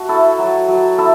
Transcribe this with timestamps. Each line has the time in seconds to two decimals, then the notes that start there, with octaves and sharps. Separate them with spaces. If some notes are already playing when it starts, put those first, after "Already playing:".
Already playing: A3 F#4
0.09 E4 A4
0.38 F#3
0.68 F#3
0.98 E4 A4